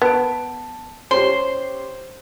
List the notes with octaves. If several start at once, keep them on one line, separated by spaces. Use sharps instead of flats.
B3 A5 D7
C#4 G4 C5 C6